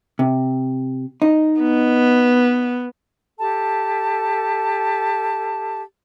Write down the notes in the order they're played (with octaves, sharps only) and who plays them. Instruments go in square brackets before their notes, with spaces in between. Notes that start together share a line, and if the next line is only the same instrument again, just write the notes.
[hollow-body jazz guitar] C3
D#4
[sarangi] B3
[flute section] G4 A4 A5